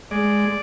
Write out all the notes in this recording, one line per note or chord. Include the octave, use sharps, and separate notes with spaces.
G#3 D5